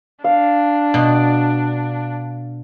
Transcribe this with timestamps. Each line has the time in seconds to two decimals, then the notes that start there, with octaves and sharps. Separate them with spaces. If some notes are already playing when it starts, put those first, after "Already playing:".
0.24 D4 F5
0.94 B2